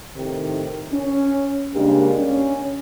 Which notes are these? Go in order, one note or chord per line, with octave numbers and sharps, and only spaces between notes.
A2 C3 D#3
C#4
C#3 G3 G#3 A#3 D4
C#4